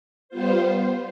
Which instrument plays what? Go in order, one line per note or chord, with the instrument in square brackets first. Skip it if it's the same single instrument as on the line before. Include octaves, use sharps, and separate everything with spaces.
[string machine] G3 B3 F4 C5